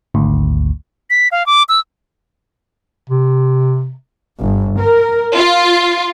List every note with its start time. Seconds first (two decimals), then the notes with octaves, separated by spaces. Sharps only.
0.14 G#1 D2
1.10 B6
1.31 F5
1.46 D6
1.69 E6
3.10 C3
4.41 G1
4.79 A#4
5.37 F4